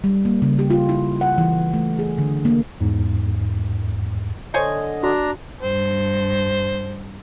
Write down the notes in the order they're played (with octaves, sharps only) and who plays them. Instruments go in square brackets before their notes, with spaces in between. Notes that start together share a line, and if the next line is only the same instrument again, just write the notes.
[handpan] G3
A#3
C#3
G4
F4
E4
F#5
E3
A3
G#4
D3
A#3
[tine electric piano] E2 G#2
[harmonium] D3 D#5 [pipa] C5 C#5 G#5
[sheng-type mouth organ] D4 A#5 [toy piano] F#4
[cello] G2 [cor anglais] C5